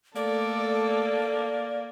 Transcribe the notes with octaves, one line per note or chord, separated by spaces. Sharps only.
A3 A#3 A4 D5